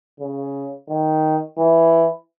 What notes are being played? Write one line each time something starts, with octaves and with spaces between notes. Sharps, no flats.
C#3
D#3
E3